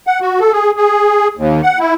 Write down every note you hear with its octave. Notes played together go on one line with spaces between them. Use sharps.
F#5
F#4
A4
G#4
G#4
D#2
F#5
E4